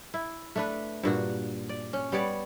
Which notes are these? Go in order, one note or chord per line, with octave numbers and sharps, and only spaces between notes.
E4
A3 D4 B4
G2 A#2 F#4
D5
C#4
G3 B3 C#5 D5